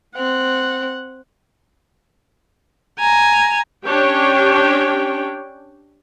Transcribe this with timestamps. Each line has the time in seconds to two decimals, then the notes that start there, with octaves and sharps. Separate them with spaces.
0.16 C4 F#5
2.99 G#5 A#5
3.85 C#4 D4 G4 C#5 G5